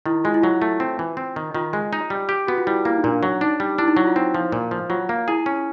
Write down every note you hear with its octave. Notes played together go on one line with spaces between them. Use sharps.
D#3 E4
G#3 F4
E4
F#3 F4
A3
C4
E3
C4
D#3
D#3 F4
G#3
D#4
G3
G4
B3 F#4
F4
G3 E4
A#3 E4
D#4
A#2 D4
F#3
D4 D#4
G3
D4 E4
D#4
F#3 E4
F4
C4
F3
A#2
F3
F#3 F4
A#3
E4 G#4
C#4